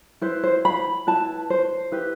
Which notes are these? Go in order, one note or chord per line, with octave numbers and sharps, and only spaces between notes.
E4 B4 C5
C5
B5
E4 B4 A5
C5
E4 G4 B4